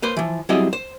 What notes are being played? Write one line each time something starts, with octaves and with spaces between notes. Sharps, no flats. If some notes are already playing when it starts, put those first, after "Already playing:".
A#3 B4 C5
E3 F3
F#3 G3 C4 E4 G#4 D#5
C5